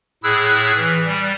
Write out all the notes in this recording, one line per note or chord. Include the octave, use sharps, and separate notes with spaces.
A2 E4 G#4 E6 F#6
E3 F6
G3